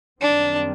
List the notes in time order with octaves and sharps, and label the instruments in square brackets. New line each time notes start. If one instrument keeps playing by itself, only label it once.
[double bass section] F#2 D#3 G3 C4 [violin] D4